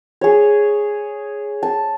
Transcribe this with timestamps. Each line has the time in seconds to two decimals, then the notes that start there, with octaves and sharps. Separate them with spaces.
0.21 G#4 C#5
1.63 A5